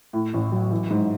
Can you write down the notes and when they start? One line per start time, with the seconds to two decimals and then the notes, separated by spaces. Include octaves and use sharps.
0.13 A2
0.34 A1
0.52 F#3
0.71 E3
0.91 G#2